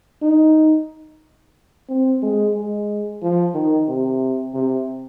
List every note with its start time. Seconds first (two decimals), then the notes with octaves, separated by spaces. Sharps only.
0.22 D#4
1.89 C4
2.22 G#3
2.55 G#3
3.22 F3
3.55 D#3
3.88 C3
4.54 C3